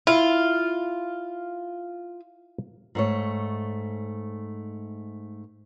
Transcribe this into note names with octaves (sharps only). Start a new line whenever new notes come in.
E4 F4
G#2 A3 C#5